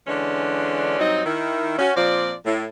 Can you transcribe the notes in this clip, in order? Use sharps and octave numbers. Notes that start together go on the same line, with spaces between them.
D3 E3 G#3 C#4 D4
G2 F#3 C4 D#4
D#3 E4
C#4 F#4
A#2 F3 C4 D5
A2